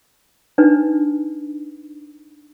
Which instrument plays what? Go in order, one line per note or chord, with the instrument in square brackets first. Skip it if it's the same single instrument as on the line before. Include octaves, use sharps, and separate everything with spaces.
[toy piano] D4 D#4 B4